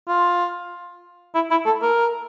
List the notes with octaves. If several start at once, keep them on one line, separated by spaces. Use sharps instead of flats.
F4
E4
E4
A4
A#4